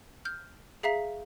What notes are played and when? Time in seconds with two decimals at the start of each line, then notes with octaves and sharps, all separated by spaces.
0.25 F6 G6
0.83 G#4 E5 F5 A#5 B6